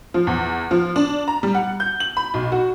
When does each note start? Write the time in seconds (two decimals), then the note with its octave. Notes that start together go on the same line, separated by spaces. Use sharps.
0.14 F3
0.27 E2
0.71 F3
0.96 D4
1.28 A#5
1.43 G3
1.55 F#5
1.80 G6
2.00 F#7
2.17 B5
2.34 B1
2.52 F#4